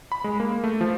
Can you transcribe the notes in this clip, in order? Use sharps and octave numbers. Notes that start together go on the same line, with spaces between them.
B5
G#3
A#3
A3
F3